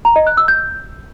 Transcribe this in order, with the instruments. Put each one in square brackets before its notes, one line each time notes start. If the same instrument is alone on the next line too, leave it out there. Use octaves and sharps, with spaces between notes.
[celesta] A#5
D#5
F#6
E6
G6